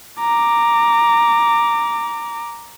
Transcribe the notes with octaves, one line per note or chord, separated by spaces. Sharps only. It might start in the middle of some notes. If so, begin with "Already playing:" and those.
A#5 D6